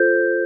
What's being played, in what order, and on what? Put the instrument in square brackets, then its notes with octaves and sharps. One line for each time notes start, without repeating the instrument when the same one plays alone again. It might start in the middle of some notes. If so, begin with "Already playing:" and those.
Already playing: [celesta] F4 A4 C5 G6